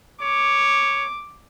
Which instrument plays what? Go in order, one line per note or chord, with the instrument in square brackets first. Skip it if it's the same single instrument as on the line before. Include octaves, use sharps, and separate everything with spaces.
[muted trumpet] C#5 [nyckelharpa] D6